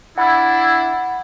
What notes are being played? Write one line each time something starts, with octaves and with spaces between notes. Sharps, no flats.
D4 E4 F#5 B5